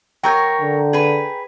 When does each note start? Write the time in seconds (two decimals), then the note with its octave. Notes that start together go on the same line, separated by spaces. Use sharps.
0.23 F#3 A#4 C#5 G5 A#5 G6
0.61 D3
0.93 G#4 B4